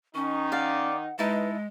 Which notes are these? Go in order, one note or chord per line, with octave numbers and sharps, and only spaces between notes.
D#3 C#4 D#4 C#6
D5 F5 F#5
G#3 D#4 E4 B4 A5